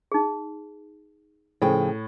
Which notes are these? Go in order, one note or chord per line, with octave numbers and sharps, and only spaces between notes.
D#4 G#4
A2 C#3 F3 G#4 G5